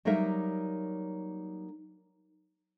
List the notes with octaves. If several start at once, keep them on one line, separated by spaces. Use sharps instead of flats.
F#3 G3 A#3 D#4 A#4 E5